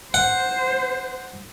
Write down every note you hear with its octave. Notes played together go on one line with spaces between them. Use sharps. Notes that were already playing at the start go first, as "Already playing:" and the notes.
C5 F#5